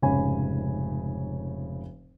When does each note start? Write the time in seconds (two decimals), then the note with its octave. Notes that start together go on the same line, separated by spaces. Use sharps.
0.02 F1 G#2 C#3 C#5 G#5 B5